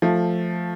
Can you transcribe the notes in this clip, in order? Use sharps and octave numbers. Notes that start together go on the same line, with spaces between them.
F3 A3